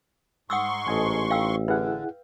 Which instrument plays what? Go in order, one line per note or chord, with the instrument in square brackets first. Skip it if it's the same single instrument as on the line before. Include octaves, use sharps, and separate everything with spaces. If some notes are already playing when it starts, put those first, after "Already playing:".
[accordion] G#2 C6 C#6 [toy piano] F#5 D#6 E6
[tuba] A1 [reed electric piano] A4 D#5 G#5
[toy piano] F5 G5 E6
[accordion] D3 [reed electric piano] E4 G#4 F#5 [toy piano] B4